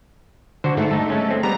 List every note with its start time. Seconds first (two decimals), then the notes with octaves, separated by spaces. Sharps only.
0.64 D3 F#4 C5
0.77 G#2 A3
0.91 D#4 A4
1.10 G#3 C#4
1.31 C4
1.43 G3 B3 A#5